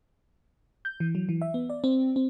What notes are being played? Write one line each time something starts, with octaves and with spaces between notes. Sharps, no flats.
G6
E3
F#3
E3
E5
B3
D5
C4
C4